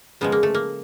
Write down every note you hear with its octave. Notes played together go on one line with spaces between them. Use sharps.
C#3 F3 G#3 B3
A#3
A3
A#3